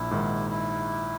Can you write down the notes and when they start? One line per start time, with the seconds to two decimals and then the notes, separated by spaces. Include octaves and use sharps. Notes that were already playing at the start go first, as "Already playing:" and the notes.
Already playing: A#1 E4
0.11 G#2 D#3
0.50 E4